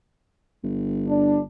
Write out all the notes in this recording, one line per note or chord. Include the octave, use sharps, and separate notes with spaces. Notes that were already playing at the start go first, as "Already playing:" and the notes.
G1
D4